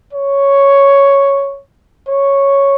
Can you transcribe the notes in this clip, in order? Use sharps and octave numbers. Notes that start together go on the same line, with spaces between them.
C#5
C#5